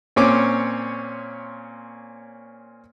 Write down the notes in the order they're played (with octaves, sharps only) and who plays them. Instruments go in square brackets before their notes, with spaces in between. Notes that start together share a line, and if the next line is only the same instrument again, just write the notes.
[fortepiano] A#2 C4 C#4 C#5 D6